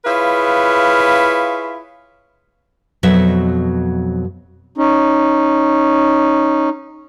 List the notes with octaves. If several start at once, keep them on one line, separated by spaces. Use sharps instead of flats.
E4 F4 G#4 B4 C#5 F5
F2 B2 F#3 E5
C#4 D#4